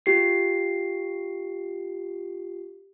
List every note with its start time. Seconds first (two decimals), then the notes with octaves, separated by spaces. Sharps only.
0.06 F4 G4 C7